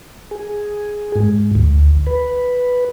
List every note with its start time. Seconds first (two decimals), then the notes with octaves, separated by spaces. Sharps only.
0.31 G#4
1.16 G#2
1.55 D2
2.07 B4